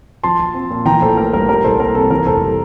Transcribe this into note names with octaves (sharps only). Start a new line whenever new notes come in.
F3 A5 C6
A#1
C4
A#2
E3 G5 A#5
A1 A4 C5
A3 A#4
G2 A#4
G3 A#4
C2 A4 C5
A#3 A#4
C3 A4
E3 A#4
F1 A4 C5
G3